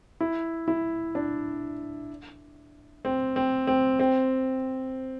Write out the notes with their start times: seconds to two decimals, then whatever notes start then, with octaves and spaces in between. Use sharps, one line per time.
0.21 E4
0.68 E4
1.15 D4
3.05 C4
3.36 C4
3.67 C4
4.00 C4